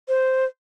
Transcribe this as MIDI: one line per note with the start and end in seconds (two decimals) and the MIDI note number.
0.09 0.45 72